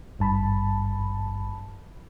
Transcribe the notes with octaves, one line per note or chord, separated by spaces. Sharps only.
G#1 G2 A5 B5